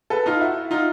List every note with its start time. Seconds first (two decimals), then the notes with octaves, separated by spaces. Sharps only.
0.10 A4 B4
0.26 D#4 F4
0.41 E4 F#4
0.71 D#4 F4